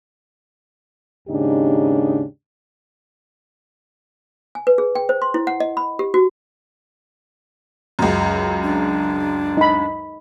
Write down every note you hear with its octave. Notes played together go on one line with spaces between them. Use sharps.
D#2 G#2 C#3 D4 D#4 G4
G#5
B4
G#4
G5
C5
C6
E4
F#5
D#5
B5
G4
F#4
C#2 F#2
D4
D#4 B5